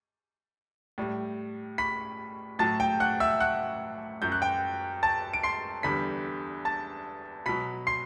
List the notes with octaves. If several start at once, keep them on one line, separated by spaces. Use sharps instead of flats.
A2 G3
B5 B6
A2 F#3 A5 A6
G5 G6
F#5 F#6
E5 E6
F#5 F#6
F#2 F#3 G6
F#6
G5 G6
A5 A6
D7
C6 C7
E2 D3 G3 B5 B6
A5 A6
B2 F#3 B5 B6
C6 C7